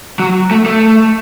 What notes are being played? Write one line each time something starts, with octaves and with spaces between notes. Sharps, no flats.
F#3
A3
A3